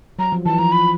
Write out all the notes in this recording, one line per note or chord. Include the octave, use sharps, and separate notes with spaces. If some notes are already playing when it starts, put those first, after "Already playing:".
F#3 A#5
F3
E3 A5
F3 A#5
B5